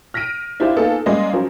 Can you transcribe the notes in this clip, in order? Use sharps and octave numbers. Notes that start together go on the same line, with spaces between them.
F6 A#6 B6 D7 D#7
D4 E4 F4 G4 C5 D5
A#3 B3 D#4 F4 G#4 A4
G3 G#3 A#3 C#4 D5 D#5
F3 F#3 C#4 A#4